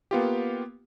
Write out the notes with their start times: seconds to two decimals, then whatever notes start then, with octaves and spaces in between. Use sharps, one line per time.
0.11 A#3 B3 F4 G4